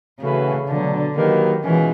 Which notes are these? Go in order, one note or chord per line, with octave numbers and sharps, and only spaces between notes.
C#3 E3 A3 C#4 F#4 B4
B2 D3 F#3 A3 D4
D#3 F#3 A#3 D#4 G4 B4
B2 E3 G#3 C#4 F4 G#4